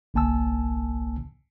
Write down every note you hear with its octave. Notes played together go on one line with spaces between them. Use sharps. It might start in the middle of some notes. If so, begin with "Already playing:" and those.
G1 C2 A#3 G#5 A5 E6